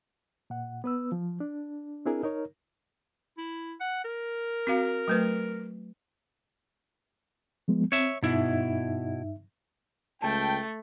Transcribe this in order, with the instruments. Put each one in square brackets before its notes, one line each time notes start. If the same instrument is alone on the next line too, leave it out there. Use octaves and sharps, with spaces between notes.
[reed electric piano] A#2 F#5
B3 B4 E6
F3
D4
C4 D4 E4 G#4 A#4
D#4 A#4 C#5
[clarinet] E4
F#5
A#4
[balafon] C4 F#4 F5
F#3 A3 B4
[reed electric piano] F3 G#3 B3
[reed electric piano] C4 [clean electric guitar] C#5 E5
[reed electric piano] G2 D#4 E5 [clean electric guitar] B2 E4
[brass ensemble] C#2 G5 [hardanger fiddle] A3 [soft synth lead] A5